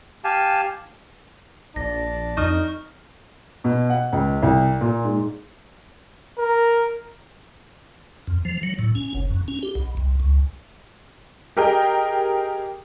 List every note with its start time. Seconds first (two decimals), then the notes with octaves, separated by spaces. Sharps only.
0.24 G4 F5 G#5 A5
1.76 A#1 D4 A#6
2.37 F2 D#4 C#6 F6
3.64 B2
3.90 F#5
4.12 C#2
4.43 C2
4.81 A#2
5.04 G#2
6.38 A#4
8.27 F2
8.45 F3
8.63 F#3
8.79 A2
8.95 C#4
9.14 F#1
9.30 F#2
9.48 C#4
9.63 G4
9.75 B1
9.97 C2
10.20 C#2
11.57 G4 G#4 A#4 D#5 G5